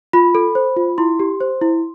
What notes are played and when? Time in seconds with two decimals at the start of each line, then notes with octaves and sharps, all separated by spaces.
0.13 F4 B5
0.35 A4
0.55 C5
0.77 F4
0.98 E4 C6
1.20 G4
1.41 C5
1.62 E4